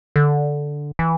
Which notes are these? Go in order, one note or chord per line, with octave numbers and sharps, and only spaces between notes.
D3
E3